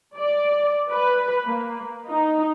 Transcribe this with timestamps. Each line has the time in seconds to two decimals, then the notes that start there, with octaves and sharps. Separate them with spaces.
0.17 D5
0.91 B4
1.44 A#3
2.08 D#4